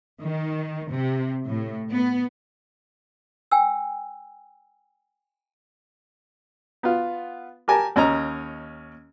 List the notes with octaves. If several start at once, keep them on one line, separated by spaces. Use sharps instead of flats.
D#3
C3
A2
B3
G5 G#5 E6
B3 F4
G4 A#4 G#5 A5
D#2 C#4 D#5 A#5